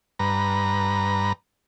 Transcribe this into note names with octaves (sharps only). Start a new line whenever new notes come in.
G2 B4 A#5